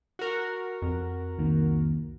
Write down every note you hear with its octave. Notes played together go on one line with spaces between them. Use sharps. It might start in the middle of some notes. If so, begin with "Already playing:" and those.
F#4 A#4
F2
C2 D#3 A#3